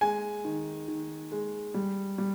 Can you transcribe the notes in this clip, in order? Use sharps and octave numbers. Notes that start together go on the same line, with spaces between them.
G#3 G#5
D#3
D#3
G#3
G3
G3